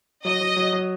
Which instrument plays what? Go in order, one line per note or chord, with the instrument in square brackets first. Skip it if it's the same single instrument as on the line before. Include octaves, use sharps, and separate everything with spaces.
[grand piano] F#3 [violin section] D#5
[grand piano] F#3
F#3
F#3